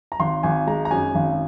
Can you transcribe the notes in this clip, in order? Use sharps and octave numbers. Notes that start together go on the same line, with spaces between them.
A#5
G#1 C6
G#1 G#5
G#3 A#5
A#5
F#2 G#5
G#1